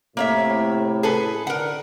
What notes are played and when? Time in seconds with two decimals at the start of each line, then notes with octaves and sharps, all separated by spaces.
0.17 A2 C3 A#3 E4 C#5 E5
1.03 G#4 A4 B4
1.47 D3 A#4 F#5